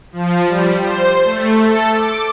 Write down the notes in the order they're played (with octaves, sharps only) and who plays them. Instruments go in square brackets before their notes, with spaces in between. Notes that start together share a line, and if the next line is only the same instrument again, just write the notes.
[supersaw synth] F3
G3
C5
A3
A4
D6